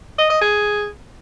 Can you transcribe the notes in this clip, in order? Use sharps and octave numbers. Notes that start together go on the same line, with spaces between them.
D#5
D#5
G#4